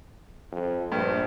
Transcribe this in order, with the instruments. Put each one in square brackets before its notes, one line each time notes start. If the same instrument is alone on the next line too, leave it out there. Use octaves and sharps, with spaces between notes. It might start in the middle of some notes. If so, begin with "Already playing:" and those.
[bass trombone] F2
[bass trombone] A#1 [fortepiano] G2